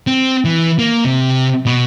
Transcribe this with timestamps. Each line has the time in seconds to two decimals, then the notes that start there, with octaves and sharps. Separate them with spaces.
0.07 C4
0.45 E3
0.79 A#3
1.05 C3
1.66 B2